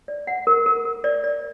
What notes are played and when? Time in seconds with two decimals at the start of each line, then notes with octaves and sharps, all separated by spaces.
0.08 D5
0.27 F#5
0.47 A#4
0.66 A#4
0.85 A#4
1.04 D5
1.24 D5